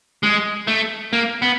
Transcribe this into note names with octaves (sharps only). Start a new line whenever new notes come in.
G#3
A3
A#3
B3